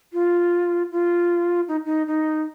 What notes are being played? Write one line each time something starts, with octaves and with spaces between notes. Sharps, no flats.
F4
F4
D#4
D#4
D#4